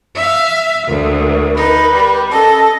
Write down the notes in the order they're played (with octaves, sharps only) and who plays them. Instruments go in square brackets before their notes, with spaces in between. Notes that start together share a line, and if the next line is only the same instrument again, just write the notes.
[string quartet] E5 F5
[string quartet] D2 [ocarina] A#4
[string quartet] D#4 [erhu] B4
[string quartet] G3
[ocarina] C#4 [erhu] A4 [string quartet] D#5